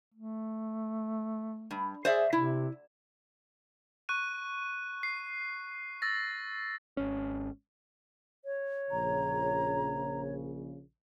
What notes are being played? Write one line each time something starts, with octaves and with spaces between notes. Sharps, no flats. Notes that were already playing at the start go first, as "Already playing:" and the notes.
A3
G2
G#4 C5 D5 E5
C3 E4
C#6 F#6 D#7
C7
E6 A6 A#6
G#1 C#4
C#5
A#1 C#3 A#5